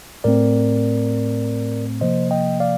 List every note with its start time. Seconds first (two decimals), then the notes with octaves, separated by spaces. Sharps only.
0.24 A2 A3 C4 A#4 D5
2.01 C3 F3 A#3 C5 D#5
2.31 D#5 G5
2.60 D5 F5